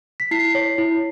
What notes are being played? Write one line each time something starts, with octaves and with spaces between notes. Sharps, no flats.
B6
E4 C7
C#5
E4